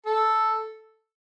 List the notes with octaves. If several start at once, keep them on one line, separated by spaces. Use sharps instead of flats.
A4